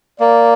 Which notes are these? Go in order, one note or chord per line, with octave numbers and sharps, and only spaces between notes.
A#3 D5